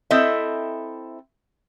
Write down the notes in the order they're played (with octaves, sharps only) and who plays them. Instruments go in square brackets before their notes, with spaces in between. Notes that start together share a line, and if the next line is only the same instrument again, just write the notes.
[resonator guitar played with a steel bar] C4 E4 A4 D#5 E5